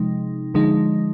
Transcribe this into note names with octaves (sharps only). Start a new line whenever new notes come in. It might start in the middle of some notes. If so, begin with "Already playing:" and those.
Already playing: C3 F3 G#3 D#4
D3 F3 G#3 D#4